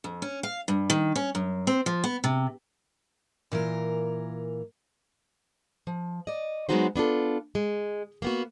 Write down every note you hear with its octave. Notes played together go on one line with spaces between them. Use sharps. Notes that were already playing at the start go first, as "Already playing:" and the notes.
F2
C#4
F5
G2
D#3
C#4
F#2
C4
F3
B3
C3
A#2 E3 F4 A#4
F3
D5 D#5
F#3 G#3 B3 D#4 F#4 C5
B3 D4 F4 A4
G#3
A#3 B3 F#4